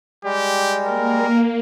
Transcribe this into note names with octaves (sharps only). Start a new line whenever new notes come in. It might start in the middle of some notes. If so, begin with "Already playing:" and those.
G3 G#3 G4
A#3 A#4